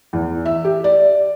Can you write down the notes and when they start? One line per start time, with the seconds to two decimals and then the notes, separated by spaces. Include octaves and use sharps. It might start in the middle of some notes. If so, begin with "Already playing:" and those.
0.13 E2
0.46 E5
0.65 G4
0.84 D5